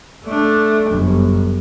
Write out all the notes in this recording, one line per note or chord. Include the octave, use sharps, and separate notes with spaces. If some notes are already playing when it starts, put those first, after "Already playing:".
A3 D4
G1 F#2